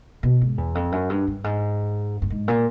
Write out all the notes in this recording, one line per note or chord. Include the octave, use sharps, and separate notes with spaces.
B2
G#2
E2
F2
F#2
G2
G2
G#2
G2
G#2
A#2